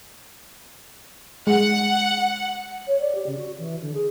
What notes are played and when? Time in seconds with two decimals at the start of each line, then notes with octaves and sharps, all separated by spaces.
1.47 G#3 F#5
2.87 C#5
3.00 D5
3.15 G4
3.26 C#3
3.38 F#4
3.58 E3
3.81 D3
3.94 G#4